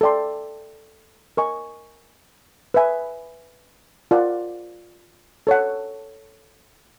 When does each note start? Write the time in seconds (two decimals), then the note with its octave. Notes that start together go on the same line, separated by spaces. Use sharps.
0.01 A4 D5 G5 C6
1.37 A#4 D#5 G#5 C#6
2.74 B4 E5 G#5
4.11 F4 A#4 D5 F#5
5.47 A4 C#5 F#5